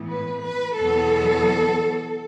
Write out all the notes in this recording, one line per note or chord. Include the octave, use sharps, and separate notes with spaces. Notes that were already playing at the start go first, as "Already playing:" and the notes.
Already playing: A2 E3 B3
B4
B4
E2 B2 F#3 B3 A4